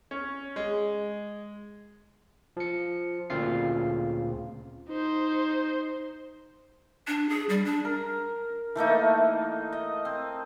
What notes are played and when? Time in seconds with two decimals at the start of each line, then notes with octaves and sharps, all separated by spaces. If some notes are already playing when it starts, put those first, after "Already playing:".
0.11 C#4
0.56 G#3
2.57 F3 C#7
3.30 D2 A#2 C#3 C4 F4 C7
4.89 D#4 C5
7.07 D4
7.29 G#4
7.49 G3
7.65 D4
7.85 A#4
8.75 E3 A3 A#3 D#4
9.72 D#5
10.05 C4